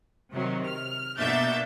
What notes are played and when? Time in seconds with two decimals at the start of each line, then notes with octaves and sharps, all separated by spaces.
0.32 C3 D#3 F#3
0.68 F6
1.18 B2 A#3 D4 E5 G6 A6